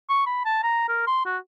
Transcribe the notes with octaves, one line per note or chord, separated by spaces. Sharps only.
C#6
B5
A5
A#5
A#4
C6
F#4